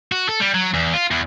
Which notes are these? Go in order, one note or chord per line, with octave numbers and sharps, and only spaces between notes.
F#4
A4
G3
F#3
E2
F4
E2